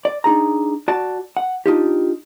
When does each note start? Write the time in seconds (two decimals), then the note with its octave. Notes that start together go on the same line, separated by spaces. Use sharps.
0.05 D5
0.24 D4 D#4 G#4 A#5
0.88 F#4 D5 A5
1.37 F#5
1.66 D4 D#4 F4 G4